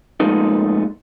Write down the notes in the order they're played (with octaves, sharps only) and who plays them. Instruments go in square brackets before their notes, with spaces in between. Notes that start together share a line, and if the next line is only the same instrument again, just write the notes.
[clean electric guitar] A#2 F3 G#3 A3 B3 D#4